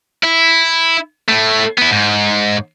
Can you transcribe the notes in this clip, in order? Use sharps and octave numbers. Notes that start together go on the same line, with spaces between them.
E4
A2 A3
B3 E4
G#2